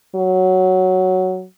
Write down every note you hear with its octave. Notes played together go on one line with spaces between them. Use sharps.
F#3